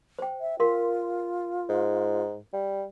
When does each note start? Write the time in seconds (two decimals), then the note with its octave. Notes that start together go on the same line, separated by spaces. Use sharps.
0.19 C5 G5
0.41 E5
0.60 F4 A#4 F5 C6
1.69 G#2
2.53 G3